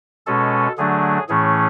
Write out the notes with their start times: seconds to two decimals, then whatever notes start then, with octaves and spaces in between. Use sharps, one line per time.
0.27 B2 G#3 C#4 A4
0.78 D3 F#3 A3 D4 G#4
1.29 A2 E3 A3 C#4 G#4